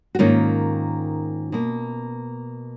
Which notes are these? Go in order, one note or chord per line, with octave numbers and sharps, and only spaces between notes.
F#4
G#2 D#3 A#3 C#4 F4
B2 A#3